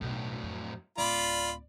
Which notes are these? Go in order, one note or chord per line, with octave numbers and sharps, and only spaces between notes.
B1 E2 A2 F#3
F2
D1 F4 D5 B5